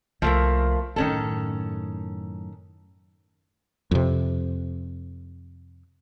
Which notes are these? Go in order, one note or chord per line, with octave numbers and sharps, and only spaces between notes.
C2 F3 A3 A#3
F#2 A2 D#3 C#4 A4
F2 C3